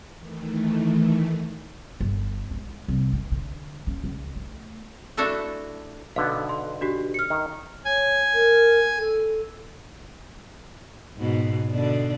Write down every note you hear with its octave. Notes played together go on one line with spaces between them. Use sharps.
D#3 E3 A3
G1
G#3
C2
D#3
D3
C#4
C#2
A3
A3 D4 E4 F#4 A4 E5
B1 D3 B3 F5
C6
D4 F#4 G4
F6 C#7
D#3
C#5 G#5 G#6
A#4
A4
G#2 B2
B2 D3 D4